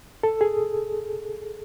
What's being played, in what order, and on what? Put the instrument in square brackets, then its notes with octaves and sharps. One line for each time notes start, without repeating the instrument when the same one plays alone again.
[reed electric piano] A4
G#4